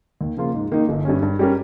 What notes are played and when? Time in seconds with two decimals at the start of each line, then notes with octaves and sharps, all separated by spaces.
0.21 D#2
0.37 C#3 F3 A#3 F4
0.54 G#2
0.72 D#3 A#3 D#4
0.89 G1
1.05 G2 G3 C#4
1.23 G2
1.39 G3 C#4 G4 A#4